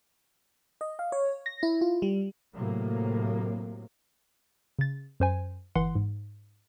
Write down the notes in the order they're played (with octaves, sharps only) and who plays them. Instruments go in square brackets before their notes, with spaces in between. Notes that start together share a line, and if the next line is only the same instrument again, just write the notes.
[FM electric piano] D#5
F5
C#5
A#6
E4
F4
G3
[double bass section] A2 C3 F#3 A#3
[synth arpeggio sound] C#3 A6
F#2 C5 G#5
G1 E3 F#5 C6
G#2